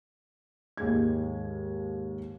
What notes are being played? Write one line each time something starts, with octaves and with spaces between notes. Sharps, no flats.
D#2 G#2 G#3 G#4 G#6